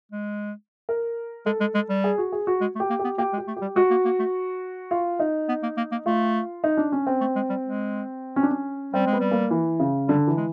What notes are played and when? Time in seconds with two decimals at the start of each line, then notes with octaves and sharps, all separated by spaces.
0.12 G#3
0.89 A#4
1.46 G#3 A4
1.60 G#3
1.75 G#3
1.89 G3
2.04 G#4
2.18 F#4
2.32 G#4
2.47 F#4
2.61 G#3
2.75 A3
2.80 G4
2.90 A#3
2.99 B3 G4
3.18 A#3 G4
3.33 G#3
3.38 G4
3.47 A3
3.57 G4
3.62 G3
3.76 G#3 F#4
3.90 A#3
4.05 A#3
4.19 A3
4.91 F4
5.19 D#4
5.48 B3
5.63 A#3
5.77 A#3
5.92 A#3
6.06 A3 F4
6.64 D#4
6.77 D4
6.92 C#4
7.07 C4
7.21 A3
7.36 G#3
7.50 G3
7.64 G#3
8.36 C#4
8.43 D4
8.51 C#4
8.94 G3 C4
9.07 G#3
9.13 B3
9.20 G3
9.31 A#3
9.51 E3
9.79 C#3
10.08 D3 G3
10.27 E3
10.37 G#3